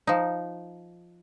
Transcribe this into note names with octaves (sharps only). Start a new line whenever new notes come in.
F3 D#4